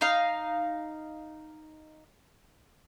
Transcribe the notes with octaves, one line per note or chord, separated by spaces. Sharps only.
D#4 F5